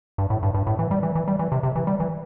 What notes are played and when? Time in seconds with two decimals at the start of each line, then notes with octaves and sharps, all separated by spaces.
0.18 G2
0.30 A2
0.43 G2
0.55 G2
0.67 A2
0.79 E3
0.91 G3
1.03 E3
1.15 E3
1.28 G3
1.39 E3
1.52 C3
1.63 C3
1.75 E3
1.87 G3
2.00 E3